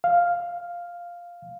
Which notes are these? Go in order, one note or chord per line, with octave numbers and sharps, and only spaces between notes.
F5